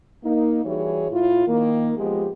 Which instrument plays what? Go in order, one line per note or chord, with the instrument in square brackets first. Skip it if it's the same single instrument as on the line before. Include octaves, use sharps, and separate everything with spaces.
[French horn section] A#3 D#4
E3 G3 E4 F#4 G#4 C#5
A2 E4 F4
D#3 A#3
F3 G#3 B3 G4